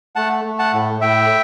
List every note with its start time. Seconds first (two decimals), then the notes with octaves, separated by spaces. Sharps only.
0.16 A3 F#5 A5
0.45 A3
0.59 F#5 A5
0.73 A2
1.01 A2 E5 G5